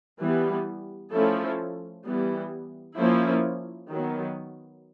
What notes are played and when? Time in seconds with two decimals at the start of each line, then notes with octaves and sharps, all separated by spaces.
0.21 E3 G3 B3
1.13 F3 A3 C#4 E4 A4
2.07 E3 G3 B3
2.98 F3 A#3 C#4 E4
3.91 D#3 F#3 B3